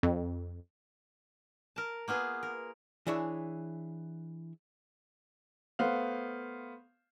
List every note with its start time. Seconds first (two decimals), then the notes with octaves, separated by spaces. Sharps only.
0.03 F2
1.76 A#4 A5
2.08 A#3 B3 F4 G#4
2.43 A#4
3.07 E3 D4 E4 G#4 C#5
5.79 A3 B3 C5 F5